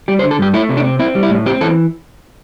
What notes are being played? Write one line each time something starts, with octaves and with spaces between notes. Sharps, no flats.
G3 G4
C5
D3
A4
G2 G4
A3 E4
C3
D4
C4
C4 E4
G3
E4
A2
C4 G4
E3 A4